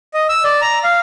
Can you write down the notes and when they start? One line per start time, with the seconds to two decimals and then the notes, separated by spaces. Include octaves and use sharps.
0.14 D#5
0.29 E6
0.44 D5
0.62 A#5
0.84 F5